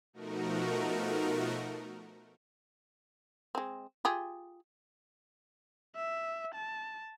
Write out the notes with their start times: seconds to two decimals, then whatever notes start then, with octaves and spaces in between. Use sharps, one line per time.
0.13 B2 F3 A3 D#4 F#4 A#4
3.55 G#3 C4
4.05 F4 G4 G#4
5.96 E5
6.55 A5